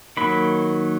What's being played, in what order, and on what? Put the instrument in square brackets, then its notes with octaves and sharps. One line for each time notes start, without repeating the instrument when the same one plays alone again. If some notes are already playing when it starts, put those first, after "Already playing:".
[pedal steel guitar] D#3 F#3 A#3 B5